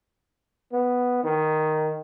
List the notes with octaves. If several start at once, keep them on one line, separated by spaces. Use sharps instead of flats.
B3
D#3